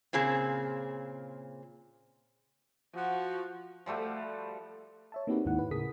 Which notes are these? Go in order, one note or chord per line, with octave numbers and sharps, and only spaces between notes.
A#2 C#3 C4 G#4
F3 F#4
F3 G3 A3 F#4
C#5 E5 A5
A#3 C4 D#4 F#4 G4 B4
D#2 G#2 D#4 E4 F#5
B4
A2 C#3 G#4 A#4 D#6 B6